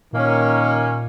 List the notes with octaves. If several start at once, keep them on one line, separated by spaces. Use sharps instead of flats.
A#2 D#3 A#3 C#4